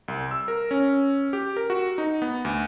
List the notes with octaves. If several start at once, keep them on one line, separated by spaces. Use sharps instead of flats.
C2
E6
A#4
C#4
G4
A#4
F#4
D#4
B3
D2